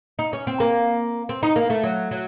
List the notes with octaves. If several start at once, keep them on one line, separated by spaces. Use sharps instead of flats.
D#4
C#4
C4
A#3
C4
D#4
A#3
A3
F#3
F#3